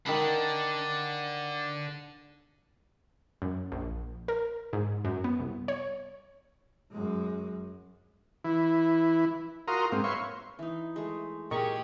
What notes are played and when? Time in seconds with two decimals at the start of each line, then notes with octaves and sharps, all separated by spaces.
0.06 D3 D#3 D4 B5
3.42 F#2
3.72 A#1
4.28 A#4
4.73 G#2
5.05 F#2
5.24 B3
5.40 C2
5.68 C#5
6.91 F#2 G#3
8.44 E3 E4
9.68 F4 F#4 A#4 A#5 C6 D#6
9.92 G#2 A#3 C4
10.04 B4 C#5 E5 F5 C6 C#6
10.59 E3 D#4
10.96 G#3 A3
11.51 A#2 G4 G#4 A#4 D#5 A#5 C#6